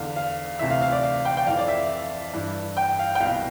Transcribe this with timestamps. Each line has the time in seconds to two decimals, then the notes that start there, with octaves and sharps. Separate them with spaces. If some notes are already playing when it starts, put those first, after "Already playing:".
Already playing: E2 D3 F5
0.16 F5
0.59 D2 C3 E3 E5
0.70 F5
0.82 F5
0.92 D5
1.04 F5
1.25 G5
1.37 G5
1.47 F2 E3 F5
1.59 D5
1.68 E5
2.34 G2 E3
2.77 G5
2.99 F5
3.15 G5
3.21 C2 B2 F5